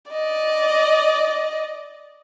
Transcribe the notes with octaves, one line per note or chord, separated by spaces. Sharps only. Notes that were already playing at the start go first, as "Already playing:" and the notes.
D5 D#5